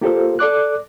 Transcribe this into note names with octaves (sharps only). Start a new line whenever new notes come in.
A#3 F4 G4 A4 A#4 C5
A4 D5 D6 F#6